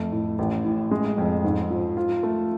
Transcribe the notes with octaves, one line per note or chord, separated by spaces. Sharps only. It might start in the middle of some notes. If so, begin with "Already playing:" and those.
Already playing: F2 A3
A2
A1
A2
G#3
F2
G#2
F3
F4
A3